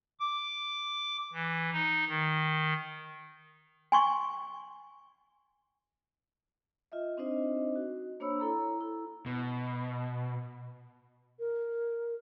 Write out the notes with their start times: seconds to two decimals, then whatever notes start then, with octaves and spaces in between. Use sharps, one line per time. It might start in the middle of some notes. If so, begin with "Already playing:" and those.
0.20 D6
1.33 E3
1.72 D#4
2.08 D#3
3.92 G#5 C6 C#6
6.92 F4 D#5 E5
7.17 C4 D4 D#4 C5 D#5
7.76 F#4
8.20 A#3 D4 C5 C#5 B5 E6
8.40 E4 A4 A#5
8.81 E4
9.26 B2
11.39 A#4